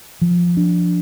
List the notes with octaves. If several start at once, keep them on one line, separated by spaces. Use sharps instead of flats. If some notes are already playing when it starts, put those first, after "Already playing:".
F3
D4